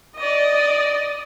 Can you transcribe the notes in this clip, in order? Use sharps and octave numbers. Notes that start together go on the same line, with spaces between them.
D5 D#5